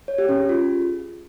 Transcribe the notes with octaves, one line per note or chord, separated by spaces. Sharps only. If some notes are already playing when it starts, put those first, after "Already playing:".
C#5
G4
C#4
G#4
F4